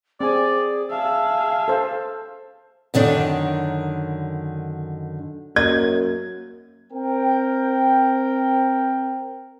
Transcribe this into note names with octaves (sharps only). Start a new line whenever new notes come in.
C4 G#4 D5 G#5
G#4 E5 F5 A5
A4 C5
F#2 D3 D#3 D4
F#2 A#3 D#5 G#6
C4 A#4 G5